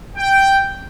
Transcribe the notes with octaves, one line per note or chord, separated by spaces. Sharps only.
G5